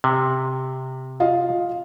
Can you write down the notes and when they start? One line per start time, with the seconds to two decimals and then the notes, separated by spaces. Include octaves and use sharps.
0.04 C3
1.20 F4 D#5 F5